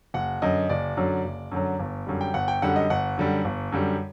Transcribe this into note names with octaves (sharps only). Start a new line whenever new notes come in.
F#1 F#5
F#2 D3 F#3 D#5
F#1 D5
F#2 D3 F#3
F#1
F#2 D3 F#3
G1
F#2 D3 G3
G5
G1 F#5
G5
F#2 D3 G3 F#5
D#5
G1 F#5
F#2 D3 G3
G1
F#2 D3 G3